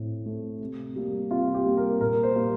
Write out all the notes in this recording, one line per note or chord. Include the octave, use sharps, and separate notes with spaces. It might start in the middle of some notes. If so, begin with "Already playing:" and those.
Already playing: A2 A3 C4
A3 C4
C3
G3 A#3
C3 F4
G4
G3 A#3
A#4
A#2 A#4
C5
G3 A#3